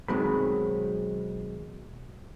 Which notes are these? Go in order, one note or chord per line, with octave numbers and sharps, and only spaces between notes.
B1 D#3 F#3 G#3 C4 B5